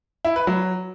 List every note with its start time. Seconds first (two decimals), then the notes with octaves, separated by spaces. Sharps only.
0.25 E4
0.36 B4
0.47 F#3